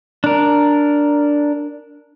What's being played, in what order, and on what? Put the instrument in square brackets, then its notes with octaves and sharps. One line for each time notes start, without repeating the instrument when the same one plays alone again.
[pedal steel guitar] D4 A#4